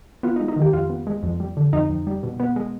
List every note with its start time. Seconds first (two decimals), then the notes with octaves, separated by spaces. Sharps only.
0.23 B3 F4
0.36 D#4
0.40 G#3
0.48 D#4
0.56 D#3
0.62 G4
0.73 F2 F4
0.90 B3
1.07 G#3
1.23 F2
1.40 G3
1.57 D3
1.73 F2 D#4
1.90 F2
2.07 G3
2.23 B2
2.40 B3
2.56 G#3